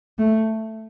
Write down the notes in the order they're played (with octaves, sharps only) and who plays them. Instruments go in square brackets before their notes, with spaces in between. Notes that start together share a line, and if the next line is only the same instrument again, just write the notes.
[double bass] A3